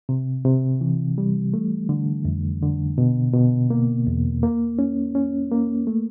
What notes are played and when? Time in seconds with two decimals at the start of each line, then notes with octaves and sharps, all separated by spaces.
0.09 C3
0.45 C3
0.81 E3
1.18 G3
1.54 A3
1.89 D3
2.25 F2
2.62 D3
2.98 B2
3.34 B2
3.70 A#3
4.07 E2
4.43 A#3
4.79 C#4
5.15 C#4
5.51 A#3
5.87 A3